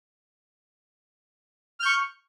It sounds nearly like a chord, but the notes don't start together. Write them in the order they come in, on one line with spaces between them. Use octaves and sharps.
F6 G6 C#6